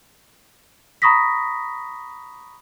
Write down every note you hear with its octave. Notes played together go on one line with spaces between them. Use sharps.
A#5 B5 C#6 D#6 A#6 B6